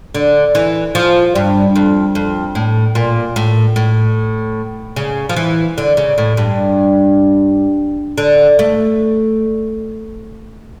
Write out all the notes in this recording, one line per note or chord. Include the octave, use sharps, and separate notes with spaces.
D3
E3
F3
G2
F2
F2
A2
A#2
A2
A2
C#3
F3
E3
D3
C#3
A2
G2
D3
A3